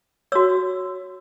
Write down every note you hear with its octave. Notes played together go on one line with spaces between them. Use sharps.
F#4 C#5 E6